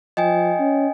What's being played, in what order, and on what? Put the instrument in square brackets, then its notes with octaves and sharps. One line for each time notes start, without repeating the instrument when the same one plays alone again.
[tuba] F3 [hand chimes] D#5 G5 G#5
[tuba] C#4